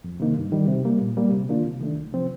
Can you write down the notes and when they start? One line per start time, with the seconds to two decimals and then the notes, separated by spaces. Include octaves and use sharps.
0.04 F2
0.20 C3 D#3 A#3 D#4
0.37 G2
0.52 D#3 G3
0.68 C3
0.85 G3 A#3
1.01 A#2
1.17 G3 A#3
1.32 C3
1.49 D#3 A#3 D4 F4
1.66 C3
1.81 D#3 A3 D4
1.97 C2
2.13 C3 F3 C4